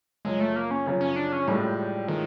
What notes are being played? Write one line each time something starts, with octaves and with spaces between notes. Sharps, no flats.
F#2 C#3 F3 G#3
A3
A#3
C#4
F#2 C#3 F3
C#4
D4
C#4
A2 F3 G3 G#3
A2 D#3 F3 G#3